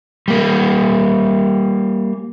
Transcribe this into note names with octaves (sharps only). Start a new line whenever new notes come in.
G3 A#3